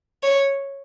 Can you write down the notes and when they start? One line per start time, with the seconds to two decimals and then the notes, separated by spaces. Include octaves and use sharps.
0.23 C#5